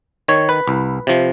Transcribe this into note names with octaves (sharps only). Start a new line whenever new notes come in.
D#3 C#5
B4
C2
C3 F3